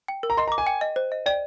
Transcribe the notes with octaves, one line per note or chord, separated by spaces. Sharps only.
G5
A#4
A#5
D#5 C6
A#5
D6
G#5
G5
D#5
C5
D#5
D5 G5